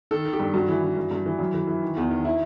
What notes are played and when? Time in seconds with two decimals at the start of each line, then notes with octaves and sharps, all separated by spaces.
0.11 D#3 A4
0.25 D#3
0.33 G4
0.40 G2
0.54 G2 F#4
0.69 E3
0.83 E3
0.97 G2
1.11 G2
1.26 E3
1.39 F#2
1.54 E3
1.68 E3
1.82 D#3
1.97 E2
2.11 D#3
2.25 D#3 E4